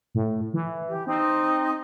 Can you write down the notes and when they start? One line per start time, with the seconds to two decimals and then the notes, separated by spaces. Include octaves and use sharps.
0.15 A2
0.54 E3
0.88 G4
1.07 C4 D#4